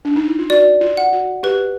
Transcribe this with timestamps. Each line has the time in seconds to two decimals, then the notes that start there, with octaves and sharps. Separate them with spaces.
0.05 D4
0.16 D#4
0.28 E4
0.39 F4
0.50 F#4 D5
0.81 F4
0.97 F#5
1.13 F#4
1.43 G4 B4